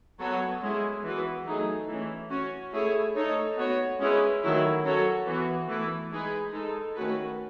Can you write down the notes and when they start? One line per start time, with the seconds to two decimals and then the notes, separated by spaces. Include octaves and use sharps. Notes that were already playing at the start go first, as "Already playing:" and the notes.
0.19 F#3 B3 F#4 A4 C#5
0.61 G#3 C#4 E4 G#4
1.03 E3 B3 F#4 B4
1.45 F#3 A3 D#4 G#4
1.88 E3 A3 C#4
2.30 C#4 F#4 C#5
2.72 A3 E4 G#4 C#5
3.15 A3 D#4 A4 C#5
3.57 B3 F#4 C#5
3.99 G#3 C#4 E4 G#4 B4
4.42 D#3 F#3 A3 E4
4.84 F#3 C#4 F#4 A4 C#5
5.26 E3 B3 F#4
5.68 E3 A3 E4 B4
6.11 G#3 D#4 G#4 B4
6.53 G#3 D#4 A4
6.95 D#3 A3 C#4 F#4 B4